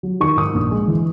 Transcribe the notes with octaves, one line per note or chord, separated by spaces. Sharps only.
F#3
D#3 C#6
G#2 D#6
A#1
G#3
E3